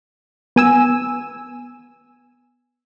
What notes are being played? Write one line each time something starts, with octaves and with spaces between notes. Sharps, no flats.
B3 G#5 E6